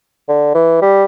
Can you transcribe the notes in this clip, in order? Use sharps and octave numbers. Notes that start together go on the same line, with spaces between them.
D3
E3
G3